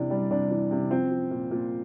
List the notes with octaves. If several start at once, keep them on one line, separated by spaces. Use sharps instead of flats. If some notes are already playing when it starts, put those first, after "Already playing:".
Already playing: C3 E3 D4
G3
C3 D4
E3
C3
F3 C4
F3
A#2
A#2